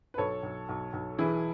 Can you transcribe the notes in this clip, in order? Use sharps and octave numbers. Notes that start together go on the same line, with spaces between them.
B4
B1 A4 C#5
B1
B1
B1
E3 E4 G#4